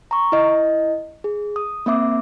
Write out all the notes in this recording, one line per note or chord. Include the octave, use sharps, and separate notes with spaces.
A#5 C#6
E4 D#5
G#4
D#6
A#3 C4 E5 D6